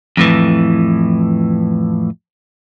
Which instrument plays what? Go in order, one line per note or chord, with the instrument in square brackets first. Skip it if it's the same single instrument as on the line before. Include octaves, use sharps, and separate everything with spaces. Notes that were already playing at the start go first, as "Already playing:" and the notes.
[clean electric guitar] F2 A2 E3